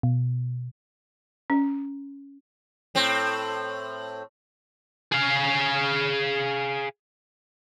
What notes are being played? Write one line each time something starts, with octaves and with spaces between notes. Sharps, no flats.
B2
C#4
A2 C4
G#4 F5